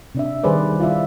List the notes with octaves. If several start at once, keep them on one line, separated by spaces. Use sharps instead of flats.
C3 D4 E5
D#3 G3 G#4 B4 C5 D5
E4 F4 D5 E5